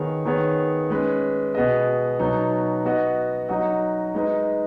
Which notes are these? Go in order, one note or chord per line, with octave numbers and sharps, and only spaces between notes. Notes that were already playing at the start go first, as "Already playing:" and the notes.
Already playing: D#3 B3 G#4 C#5
D#3 B3 G#4 C#5
G#3 C#4 B4
B2 B3 G#4 D#5
B2 F#3 B3 D#4
B3 F#4 D#5
F#3 D#4 F#4 D#5
G#3 D#4 B4 D#5